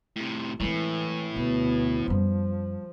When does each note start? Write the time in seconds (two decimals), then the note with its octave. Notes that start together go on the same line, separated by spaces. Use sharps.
0.16 A2 C3
0.60 A2 E3 G#3 C4
1.36 D2 B2 B3
2.08 F#2 F3 G3